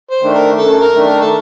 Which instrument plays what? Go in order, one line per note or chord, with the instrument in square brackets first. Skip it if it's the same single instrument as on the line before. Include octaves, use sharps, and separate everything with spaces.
[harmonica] C5
[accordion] D#3 A3 D4
[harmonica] A#4
[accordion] F#2 [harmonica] A4
[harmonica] A#4
[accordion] D#3 A3 D4
[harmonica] A#4
A4